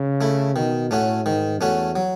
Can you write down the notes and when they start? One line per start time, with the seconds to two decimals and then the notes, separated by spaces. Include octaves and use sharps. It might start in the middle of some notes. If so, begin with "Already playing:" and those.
Already playing: C#3
0.21 A3 E4
0.56 B2 D#3
0.91 A2 A3 C#4 F#4
1.25 G#2 D#3
1.61 E2 A3 C#4 F#4
1.96 F#3